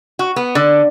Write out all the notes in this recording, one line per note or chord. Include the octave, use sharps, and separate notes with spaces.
F#4
B3
D3